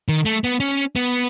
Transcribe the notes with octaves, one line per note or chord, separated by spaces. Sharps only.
D#3
A3
B3
C#4
B3